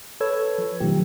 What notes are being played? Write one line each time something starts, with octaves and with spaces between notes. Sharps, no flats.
A4 B4 C#5 E6 G#6
F3
B2 D#3 F3 F#3 A3 G4